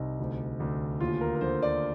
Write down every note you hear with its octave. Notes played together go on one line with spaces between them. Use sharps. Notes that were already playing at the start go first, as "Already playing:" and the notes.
Already playing: C2 D#4
D2
D2
D#2 F4
A#4
A#4
D3 C5
D5